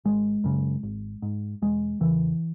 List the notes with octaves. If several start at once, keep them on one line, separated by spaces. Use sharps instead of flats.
G#1 G#3
F#2 C#3
G#1
G#2
E1 G#3
E2 C#3 E3